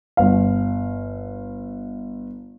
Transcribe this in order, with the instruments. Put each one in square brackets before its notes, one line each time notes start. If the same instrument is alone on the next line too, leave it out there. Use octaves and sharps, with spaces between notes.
[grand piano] G1 F5